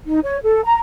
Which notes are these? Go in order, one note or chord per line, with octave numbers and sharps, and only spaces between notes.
D#4
C#5
A4
A#5